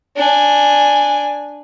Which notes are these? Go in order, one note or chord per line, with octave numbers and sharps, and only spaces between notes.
D4 G#5